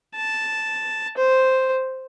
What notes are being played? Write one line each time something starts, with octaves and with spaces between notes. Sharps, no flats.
A5
C5